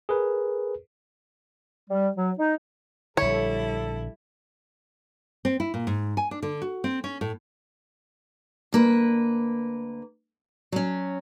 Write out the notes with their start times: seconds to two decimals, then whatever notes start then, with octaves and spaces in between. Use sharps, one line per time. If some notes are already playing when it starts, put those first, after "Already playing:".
0.09 G#4 A#4 B4
1.90 G3
2.17 F#3
2.37 D#4
3.17 A#1 D3 G3 E4 A4 C#5
5.45 C4
5.60 E4
5.74 A#2
5.87 G#2
6.17 G#5
6.31 D4
6.42 D3
6.62 F#4
6.84 C4
7.04 C#4
7.21 A2
8.73 D2 A#3 B4
10.72 F#3 C#4